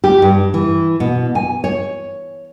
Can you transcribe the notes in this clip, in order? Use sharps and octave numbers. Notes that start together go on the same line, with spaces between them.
G4
G2
E3
B2
G#5
C#5